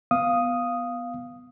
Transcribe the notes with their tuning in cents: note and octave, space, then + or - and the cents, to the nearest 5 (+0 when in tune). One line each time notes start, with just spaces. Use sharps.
B3 +0 F5 +0 D#6 +0